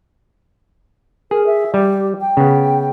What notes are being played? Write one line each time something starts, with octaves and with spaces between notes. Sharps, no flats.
G#4 A#4
E5
G3 G4
G5
C#3 B3